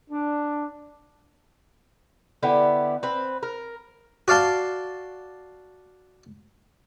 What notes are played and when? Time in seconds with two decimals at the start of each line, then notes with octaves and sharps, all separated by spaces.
0.10 D4
2.43 D3 B3 E4 G4
3.03 C4 B4
3.43 A#4
4.28 F#4 D5 F5 A5 C6